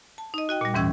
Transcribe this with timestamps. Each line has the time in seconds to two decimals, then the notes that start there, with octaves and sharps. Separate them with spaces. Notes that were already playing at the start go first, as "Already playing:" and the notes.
0.18 A5
0.34 D#4 D#5
0.49 F#4 D#5 G5
0.61 A#2 G3
0.74 D#2 G#2 E3 C#4 E6 G#6